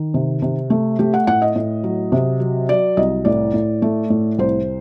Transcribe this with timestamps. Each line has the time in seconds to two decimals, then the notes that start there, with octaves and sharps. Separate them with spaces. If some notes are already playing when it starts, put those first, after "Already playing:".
Already playing: D#3
0.14 C3
0.42 C3
0.70 A3
0.99 A3 G4
1.14 F#5
1.27 A2 F#5
1.42 D#5
1.56 A2
1.84 F#3
2.12 C3
2.40 F#3
2.69 F#3 D5
2.97 C2 D#5
3.25 A2 D5
3.54 A2
3.82 A3
4.10 A2
4.38 C2 C5